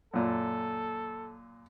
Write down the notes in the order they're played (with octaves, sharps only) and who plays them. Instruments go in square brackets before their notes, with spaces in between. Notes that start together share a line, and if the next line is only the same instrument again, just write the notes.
[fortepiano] F#2 A#2 [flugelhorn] A4